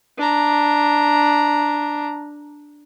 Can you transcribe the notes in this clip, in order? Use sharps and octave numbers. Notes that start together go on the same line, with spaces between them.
D4 A#5